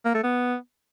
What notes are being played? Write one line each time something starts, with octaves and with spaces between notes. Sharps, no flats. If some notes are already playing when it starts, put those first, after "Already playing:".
A#3
A3
B3